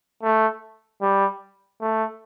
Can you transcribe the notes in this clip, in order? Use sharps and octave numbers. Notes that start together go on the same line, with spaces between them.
A3
G3
A3